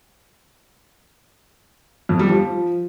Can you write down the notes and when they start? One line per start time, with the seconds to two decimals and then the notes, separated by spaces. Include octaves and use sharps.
2.09 F2
2.19 G3
2.29 F3